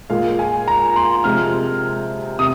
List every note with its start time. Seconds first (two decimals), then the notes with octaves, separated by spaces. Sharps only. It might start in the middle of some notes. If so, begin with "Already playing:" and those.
0.10 A#2 G#3 F5
0.39 G#5
0.68 A#5
0.96 C6
1.24 C3 F3 G#3 F6
2.39 C3 D#6